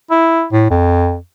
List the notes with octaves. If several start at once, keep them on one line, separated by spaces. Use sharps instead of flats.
E4
A2
F2